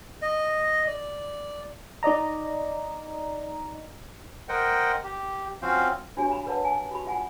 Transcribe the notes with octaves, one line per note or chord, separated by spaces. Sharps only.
D#5
D5
D#4 D5 D#5 A#5
A#4 C5 D#5 F#5 G5
G4
F3 C4 C#4 F#4 C5 F5
D4 F#4 G4 C#5 G#5
F5 A#5 B5
A#4 B4 C#5 D5 F#5 A5
G#5
F#4 G4 B5
F4 E5 F#5 G#5